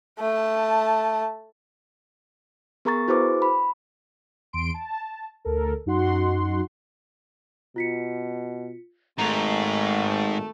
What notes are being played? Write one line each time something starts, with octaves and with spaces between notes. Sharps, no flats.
A3 A5
B3 G#4 A#4 A#5 C#6 A6
E4 F#4 G#4 B4 C5 D6
B5
E2 C6 D7
A5
D2 A4 A#4
F#2 D#4 F#4 F#5 C6
B2 F4 B6 C#7
G#1 G#2 A3 A#5 D#7 F7